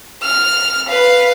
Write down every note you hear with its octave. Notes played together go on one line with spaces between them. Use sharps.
F6
B4 F5